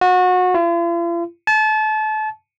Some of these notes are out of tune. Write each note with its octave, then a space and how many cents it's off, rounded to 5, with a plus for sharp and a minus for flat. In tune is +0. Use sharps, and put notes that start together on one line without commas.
F#4 -25
F4 -45
A5 -30